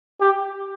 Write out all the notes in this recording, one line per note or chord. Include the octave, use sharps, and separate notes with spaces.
G4